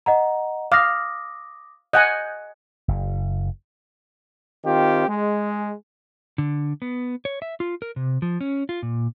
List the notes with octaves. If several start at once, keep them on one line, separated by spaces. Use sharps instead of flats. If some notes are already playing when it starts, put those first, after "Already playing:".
D#5 F#5 A#5
F5 D6 D#6 A#6
D#5 F#5 G#5 F#6 G6
F#1
D#3 C4 F4 G4
G#3
D3
B3
C#5
E5
F4
A#4
C3
F3
C#4
F4
A#2